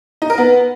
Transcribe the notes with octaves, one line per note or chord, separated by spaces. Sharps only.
D#4
A#4
B3